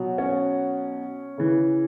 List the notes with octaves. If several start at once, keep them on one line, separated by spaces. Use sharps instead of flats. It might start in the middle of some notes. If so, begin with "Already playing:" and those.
Already playing: B2 F#3
C#4
C#3 E3